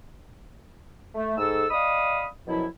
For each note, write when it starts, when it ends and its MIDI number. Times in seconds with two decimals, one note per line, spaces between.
1.14 1.32 57
1.37 1.64 44
1.37 1.64 69
1.37 1.64 88
1.70 2.25 74
1.70 2.25 75
1.70 2.25 77
1.70 2.25 83
1.70 2.25 87
2.47 2.64 42
2.47 2.64 47
2.47 2.64 53
2.47 2.64 54
2.47 2.64 64